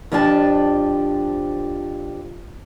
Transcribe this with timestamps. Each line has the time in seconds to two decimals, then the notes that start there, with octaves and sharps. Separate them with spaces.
0.12 F2 F3 D4 G4 G#4 A5